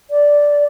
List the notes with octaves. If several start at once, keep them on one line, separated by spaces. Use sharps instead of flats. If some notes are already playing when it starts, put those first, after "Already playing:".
D5